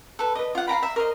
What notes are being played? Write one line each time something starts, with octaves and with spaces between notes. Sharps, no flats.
A4 B4
B4 D#5
F4 F#5
F5 G5 A#5 B5
E5
A#4 C5 D#5